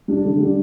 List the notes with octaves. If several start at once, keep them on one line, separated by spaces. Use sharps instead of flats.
G3 D4
D3
G3 D4